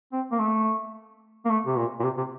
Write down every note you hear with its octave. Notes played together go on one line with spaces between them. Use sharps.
C4
A#3
A3
A#3
A3
C3
A#2
A#2
C3
C3